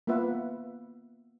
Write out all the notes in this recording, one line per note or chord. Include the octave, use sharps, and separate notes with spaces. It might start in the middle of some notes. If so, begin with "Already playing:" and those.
A#3 B3 F4 B4 E5 F#5